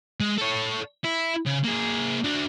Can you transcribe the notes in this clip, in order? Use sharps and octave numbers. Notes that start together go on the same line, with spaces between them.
G#3
A4 C#5
E4
C#3
A#3 G#4
D4 F#4